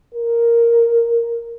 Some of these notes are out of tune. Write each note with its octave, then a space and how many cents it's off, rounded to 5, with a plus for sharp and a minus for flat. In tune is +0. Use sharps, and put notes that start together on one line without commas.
A#4 +0